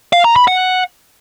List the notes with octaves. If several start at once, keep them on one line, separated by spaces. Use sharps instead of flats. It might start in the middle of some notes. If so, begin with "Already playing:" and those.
F5
A#5
B5
F#5